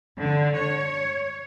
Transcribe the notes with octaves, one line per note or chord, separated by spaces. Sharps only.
D3
C#5